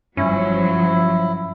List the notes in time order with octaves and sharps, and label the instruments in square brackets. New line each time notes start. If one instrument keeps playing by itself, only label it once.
[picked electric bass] F#1 G2 [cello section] F3 F#3 [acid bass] C#4 [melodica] E4